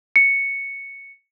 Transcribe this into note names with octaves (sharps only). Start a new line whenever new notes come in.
C#7